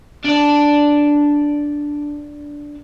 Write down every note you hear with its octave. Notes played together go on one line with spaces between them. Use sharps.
D4 D5